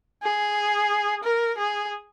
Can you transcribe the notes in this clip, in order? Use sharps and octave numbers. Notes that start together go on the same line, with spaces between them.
G#4
A#4
G#4